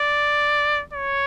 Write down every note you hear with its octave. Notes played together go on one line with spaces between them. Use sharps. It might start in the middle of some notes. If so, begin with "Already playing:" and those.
Already playing: D5
C#5